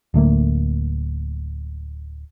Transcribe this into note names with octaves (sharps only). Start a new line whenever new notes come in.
D1 D3 A3 A#3